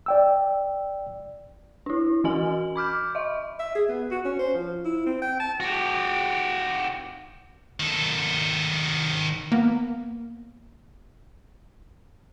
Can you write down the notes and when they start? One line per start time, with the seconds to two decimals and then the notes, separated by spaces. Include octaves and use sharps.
0.06 D5 G5 E6
1.86 D4 E4
2.24 E3 C#4 F#4 D#5 G#5 F#7
2.76 B5 D6 F6 G6
3.15 D#5 E5
3.60 E5
3.75 G#4
3.89 B3
4.11 F#4
4.25 C#4
4.39 C5
4.54 F3
4.85 E4
5.06 C4
5.22 G5
5.40 A5
5.60 F#4 G4
7.80 D#3 A4
9.52 A#3 B3